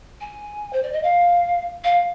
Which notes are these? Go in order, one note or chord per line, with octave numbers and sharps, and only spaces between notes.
G#5
C5
D5
D#5
F5
F5